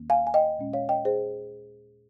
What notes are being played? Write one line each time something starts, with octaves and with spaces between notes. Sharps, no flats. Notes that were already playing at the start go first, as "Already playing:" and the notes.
Already playing: D#2 D#3 A#3 C#4
F5 G#5
G#5
D#5 G5
A#2 G#3 C#4
C#5 F5
D#5 G5
G#4 C5